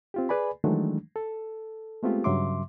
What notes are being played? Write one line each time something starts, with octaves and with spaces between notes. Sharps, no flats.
C4 F4 G4
G#4 B4 D5 G#5 B5
D#3 E3 F#3 G#3 A3 D4
A4
G#3 A3 B3 C4 F4 G4
G2 C#3 F#3 E5 C6 D6